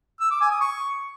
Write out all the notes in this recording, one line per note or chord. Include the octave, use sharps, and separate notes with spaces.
E6
D6
G#5
D#6
C#6